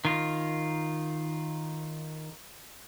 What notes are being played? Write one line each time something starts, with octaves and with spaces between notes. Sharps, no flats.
D#3 F4